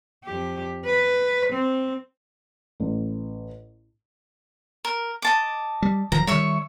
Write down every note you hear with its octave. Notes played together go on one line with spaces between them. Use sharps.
F2 G4
B4
C4
A1
A#4
D#5 A5 D6
G3
D1 D#3 F3 A#5
D#3 G3 C#5 E5 C#6